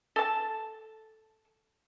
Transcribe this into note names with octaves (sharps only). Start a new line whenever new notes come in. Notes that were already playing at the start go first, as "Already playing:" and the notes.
A4 A5